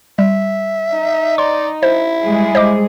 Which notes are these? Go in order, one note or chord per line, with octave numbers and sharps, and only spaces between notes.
G3 E5
D#4
D5 C6
E4 C5
G3 G#3 G#4
C5 D#5 D6